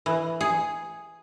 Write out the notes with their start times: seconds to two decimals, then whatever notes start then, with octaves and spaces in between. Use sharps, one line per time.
0.06 E3
0.41 G#4